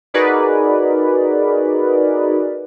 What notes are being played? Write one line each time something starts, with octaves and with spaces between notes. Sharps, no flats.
D#4 F#4 G#4 A#4 B4 D5